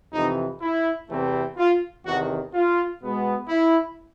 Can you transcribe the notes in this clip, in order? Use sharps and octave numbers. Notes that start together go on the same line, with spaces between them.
F2 C3 E3 D#4
E4
E2 C3 E3 A3 C4
F4
E2 C3 D#3 F#4
F4
B2 G#3 B3
E4